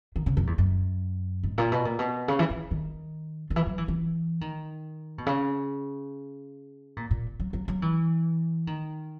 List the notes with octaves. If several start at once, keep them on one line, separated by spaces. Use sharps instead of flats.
D#3
C#3
F#2
E2
F#2
G#2
A#2
B2
A#2
B2
C#3
E3
E3
D#3
D#3
E3
F#3
E3
E3
D#3
B2
C#3
A#2
A#2
F#3
F#3
F#3
E3
D#3